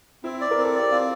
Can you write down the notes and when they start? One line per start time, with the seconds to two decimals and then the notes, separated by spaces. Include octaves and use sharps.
0.24 C4 E4
0.41 D5
0.51 A#4
0.58 C4
0.65 A4
0.75 G4 D5
0.91 C4 F4